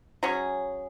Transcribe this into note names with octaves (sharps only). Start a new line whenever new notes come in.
F#3 C#4 G#4